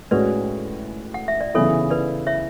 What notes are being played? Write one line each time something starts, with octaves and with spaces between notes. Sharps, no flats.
A2 G#3 C#4 F#4 B4 D5
F#5
E5
D5
C#3 E3 B3 E4 A4 C#5
B4 D5
C#5 E5